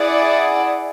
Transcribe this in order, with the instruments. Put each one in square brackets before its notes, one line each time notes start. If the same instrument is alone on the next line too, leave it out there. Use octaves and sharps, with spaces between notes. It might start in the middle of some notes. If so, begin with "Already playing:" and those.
Already playing: [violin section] E4 G#4 D5 F#5